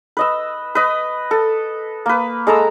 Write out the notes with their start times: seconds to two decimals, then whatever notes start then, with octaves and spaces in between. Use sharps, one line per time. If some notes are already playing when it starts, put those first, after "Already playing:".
0.17 B4 D#5 E6
0.75 B4 D#5
1.31 A4
2.06 A#3 B4
2.47 G#3 A4 A#5 E6